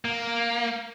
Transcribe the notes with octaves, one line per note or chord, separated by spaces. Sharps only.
A#3